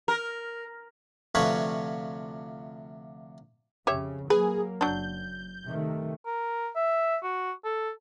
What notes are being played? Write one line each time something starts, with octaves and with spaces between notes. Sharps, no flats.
A#4
D2 C3 F3 B4 C#5
F2 C#3 G4 C#5 E5
F#3 A#3 G#4 B4
F#1 F#3 D4 G6
C3 D#3 A3
A#4
E5
F#4
A4